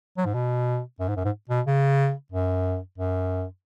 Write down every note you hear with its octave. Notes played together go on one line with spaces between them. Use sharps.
F#3
G#2
B2
F#2
G#2
F#2
G#2
B2
C#3
F#2
F#2